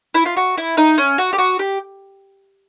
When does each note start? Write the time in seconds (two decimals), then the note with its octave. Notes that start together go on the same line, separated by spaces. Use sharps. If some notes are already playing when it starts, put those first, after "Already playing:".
0.14 E4
0.25 F4
0.37 F#4
0.57 E4
0.77 D#4
0.98 C#4
1.18 F#4
1.33 G4
1.38 F#4
1.59 G4